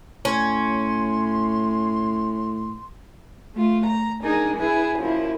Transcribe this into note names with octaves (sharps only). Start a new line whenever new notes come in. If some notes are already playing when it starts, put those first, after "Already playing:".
A2 C#4 C6
A3 F4
A#5
D4 D#4 G#4 A#4
E4 G#4 B4
F#2 F3 A#3 E4